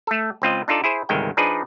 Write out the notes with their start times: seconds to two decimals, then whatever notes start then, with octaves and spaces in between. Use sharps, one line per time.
0.07 A3 A4
0.42 C#2 C4 F4 D#5
0.68 D4 D#4 F4 A4 D5
0.84 E4 G#4 C5
1.09 G1 C2 D#3 G#3 G5
1.37 F3 D4 D#4 G#4 B4 D5